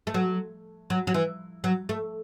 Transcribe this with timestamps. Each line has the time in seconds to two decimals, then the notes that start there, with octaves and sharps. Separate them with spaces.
0.07 A3
0.14 F#3
0.90 F#3
1.07 F#3
1.14 E3
1.64 F#3
1.89 A3